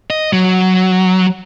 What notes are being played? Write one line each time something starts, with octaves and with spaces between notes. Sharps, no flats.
D#5
F#3